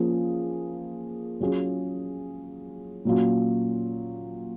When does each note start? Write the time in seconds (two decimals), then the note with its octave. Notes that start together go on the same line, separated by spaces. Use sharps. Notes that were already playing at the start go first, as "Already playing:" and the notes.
Already playing: F3 A#3 C#4 F4 G#4
1.40 F#3 C#4 F4 G#4
3.05 A#2 F#3 C#4 F4